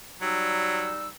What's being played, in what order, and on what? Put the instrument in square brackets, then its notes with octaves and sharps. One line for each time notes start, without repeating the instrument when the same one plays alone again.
[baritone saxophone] F#3 [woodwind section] G3 D#4 E6